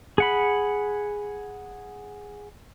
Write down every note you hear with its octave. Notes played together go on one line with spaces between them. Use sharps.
G#4 F#5 B5